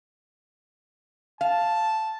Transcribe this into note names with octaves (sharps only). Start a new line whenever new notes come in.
F5 A5